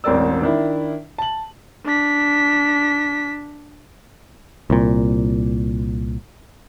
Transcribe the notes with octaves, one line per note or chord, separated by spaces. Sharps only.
E1 A1 C4 A#4 D5 E6
D#3 D4 E4
A5 F#7
D4 B6
C2 A#2